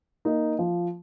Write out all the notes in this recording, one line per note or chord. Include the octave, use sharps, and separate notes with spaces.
A#3 D#4
F3